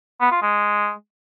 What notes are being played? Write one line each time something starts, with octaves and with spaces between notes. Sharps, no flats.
B3
F4
G#3